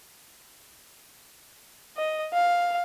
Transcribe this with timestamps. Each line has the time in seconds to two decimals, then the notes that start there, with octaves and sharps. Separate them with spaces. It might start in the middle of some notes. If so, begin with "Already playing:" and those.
1.97 D#5
2.33 F5